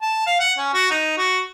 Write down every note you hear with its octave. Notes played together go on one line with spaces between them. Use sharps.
A5
F5
F#5
C#4
F#4
D#4
F#4